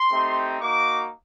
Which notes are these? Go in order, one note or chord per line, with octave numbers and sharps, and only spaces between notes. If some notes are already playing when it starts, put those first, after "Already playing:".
Already playing: C6
A3 C4 D#4 G4
A#3 D#4 F#4 D6